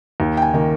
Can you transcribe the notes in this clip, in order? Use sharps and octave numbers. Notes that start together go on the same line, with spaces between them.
D#2
G5
G#5
D#3 A#3